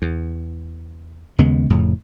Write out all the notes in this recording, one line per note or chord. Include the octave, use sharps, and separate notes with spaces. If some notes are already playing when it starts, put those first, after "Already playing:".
E2
D#2 C#3 G#3 B3
F1 F2 A2 C#3